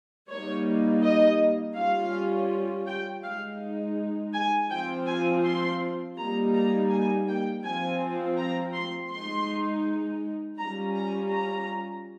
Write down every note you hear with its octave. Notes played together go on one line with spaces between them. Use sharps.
G3 A#3 D#4 C#5
D#5
G3 C#4 F4 F5
G5
G#3 D#4 F5
G#5
F3 C4 F4 G5
G#5
C6
G3 A#3 D#4 A#5
A#5
G#5
G5
F3 C4 F4 G#5
A#5
C6
G#3 D#4 C6
G3 C#4 F4 A#5
A#5
A#5